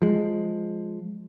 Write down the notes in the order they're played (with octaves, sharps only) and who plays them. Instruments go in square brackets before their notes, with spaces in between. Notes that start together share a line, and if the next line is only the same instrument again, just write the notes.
[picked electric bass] F3 G#3